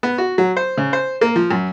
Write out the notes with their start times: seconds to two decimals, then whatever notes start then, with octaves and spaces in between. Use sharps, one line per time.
0.03 B3
0.18 F#4
0.38 F#3
0.57 C5
0.78 C#3
0.93 C5
1.21 A#3
1.36 F3
1.51 F#2